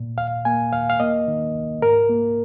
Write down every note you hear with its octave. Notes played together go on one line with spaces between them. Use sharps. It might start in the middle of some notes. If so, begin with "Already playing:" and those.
Already playing: A#2
D#2 F5
A#3 G#5
D#2 F5
F5
A#3 D#5
D#3
C2
G#2 A#4
A#3